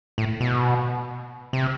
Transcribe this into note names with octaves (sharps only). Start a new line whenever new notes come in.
A2
B2
C3